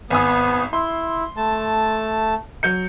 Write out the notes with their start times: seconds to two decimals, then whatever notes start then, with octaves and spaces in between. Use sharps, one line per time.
0.10 G#1 B3 G#5 D#6
0.73 E4 C6
1.37 A3 A5
2.63 F#3 G6 C#7